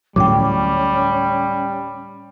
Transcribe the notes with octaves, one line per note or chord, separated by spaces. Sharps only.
D2 A2 F#3 G3 C#4 G5 D6